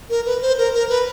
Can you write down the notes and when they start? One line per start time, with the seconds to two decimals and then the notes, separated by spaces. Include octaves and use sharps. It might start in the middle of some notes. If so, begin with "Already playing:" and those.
0.10 A#4
0.26 B4
0.42 C5
0.58 A#4
0.74 A#4
0.90 B4